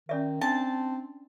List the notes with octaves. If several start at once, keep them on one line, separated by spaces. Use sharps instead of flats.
D#3 C#4 D5 E5
C4 D4 A5